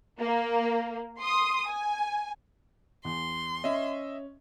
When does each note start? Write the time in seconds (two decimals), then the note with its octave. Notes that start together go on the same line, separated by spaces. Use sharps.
0.21 A#3
1.20 C6 D#6
1.67 G#5
3.05 E2 C6
3.64 C#4 D#5 E5